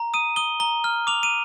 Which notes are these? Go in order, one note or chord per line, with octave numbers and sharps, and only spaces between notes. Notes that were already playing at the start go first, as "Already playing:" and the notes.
Already playing: A#5
D#6 D#7
D#6 G7
A#5 G7
F6
D6 F7
D#7